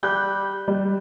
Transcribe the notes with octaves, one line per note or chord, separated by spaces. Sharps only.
G3 F#6 G6
G3